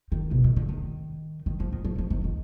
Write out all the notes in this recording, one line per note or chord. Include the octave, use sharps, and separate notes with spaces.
D#3
B2
D#3
D3
D#3
D#3
F3
D#3
F3
F3
D#3
D#3